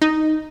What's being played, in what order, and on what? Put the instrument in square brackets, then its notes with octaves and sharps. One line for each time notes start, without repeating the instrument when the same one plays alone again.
[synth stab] D#4